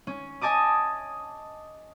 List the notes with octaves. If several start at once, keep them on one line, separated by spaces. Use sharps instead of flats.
C#4
D#5 G#5 A5 D6 D#6